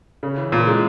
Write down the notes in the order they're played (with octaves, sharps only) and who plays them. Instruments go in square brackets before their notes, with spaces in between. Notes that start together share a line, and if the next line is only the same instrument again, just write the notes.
[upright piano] C#3
E3
[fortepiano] A#2 [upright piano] E3
[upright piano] G#3